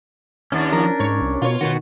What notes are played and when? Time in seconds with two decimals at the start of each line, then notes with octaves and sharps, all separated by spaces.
0.52 D#2 C#4 D4
0.73 F3 A#4
1.00 G#2 C#5
1.22 C2
1.42 B2 F4 C#5
1.61 B2 D#3 B3 F#4